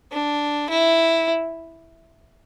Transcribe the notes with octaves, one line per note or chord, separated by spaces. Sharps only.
D4
E4